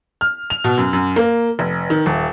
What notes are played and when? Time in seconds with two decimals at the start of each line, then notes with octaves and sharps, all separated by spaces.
0.21 F6
0.50 F7
0.64 B2
0.78 F#2
0.93 F#2
1.16 A#3
1.59 F1
1.90 D#3
2.06 D#1